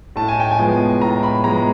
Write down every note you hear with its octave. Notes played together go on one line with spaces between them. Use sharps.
A2 A5
G#5
G5
G#5
F3 G#3 B3
A2 A#5
B5
F3 G#3 B3 A#5